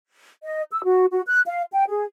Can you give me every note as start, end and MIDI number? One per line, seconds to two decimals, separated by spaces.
0.44 0.63 75
0.72 0.80 88
0.84 1.05 66
1.11 1.22 66
1.27 1.40 90
1.47 1.63 77
1.72 1.84 79
1.89 2.05 68